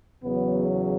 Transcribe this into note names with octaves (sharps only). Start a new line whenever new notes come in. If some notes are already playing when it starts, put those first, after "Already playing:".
E2 C#3 F#3 B3